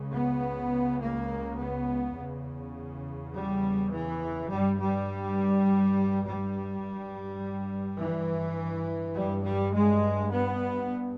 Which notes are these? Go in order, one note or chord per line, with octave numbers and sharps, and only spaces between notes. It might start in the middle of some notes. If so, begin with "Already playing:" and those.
Already playing: C#2 C#3
B3
A#3
B3
E2 C#3
G3
E3
G2 G3
G3
G3
G2
E3
G2 G3
G3
G#3
B3